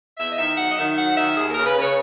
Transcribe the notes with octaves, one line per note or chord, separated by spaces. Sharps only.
E2 E5
D#5
D#3 E5
F#3 F#5
D#5
D#3 E5
F#3 F#5
D#3 E5
D#2 G#4
A#4
C#3
B4
C#3 C#5